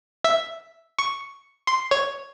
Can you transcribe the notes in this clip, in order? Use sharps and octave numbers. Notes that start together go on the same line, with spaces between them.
E5
C#6
C6
C#5